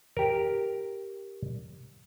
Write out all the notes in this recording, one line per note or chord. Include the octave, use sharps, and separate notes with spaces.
G4 A#4